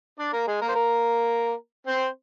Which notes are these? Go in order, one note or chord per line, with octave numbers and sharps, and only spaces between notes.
D4 D5
A#3 A#4
G#3 G#4
A#3 A#4
C5
A#3 A#4
C4 C5